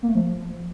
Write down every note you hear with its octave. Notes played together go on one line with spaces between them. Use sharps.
A#3
A3
F3